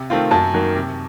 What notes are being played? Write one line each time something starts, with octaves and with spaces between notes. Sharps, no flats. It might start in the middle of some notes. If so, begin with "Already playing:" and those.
Already playing: C3
D#3 A3 C4 F4
F#2 A5
D#3 F#3 A#3
C3